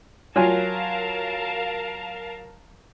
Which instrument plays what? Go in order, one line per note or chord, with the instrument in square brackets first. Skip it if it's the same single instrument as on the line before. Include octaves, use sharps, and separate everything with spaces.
[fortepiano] F#3 F4 G#5 [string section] A#4 F5 A5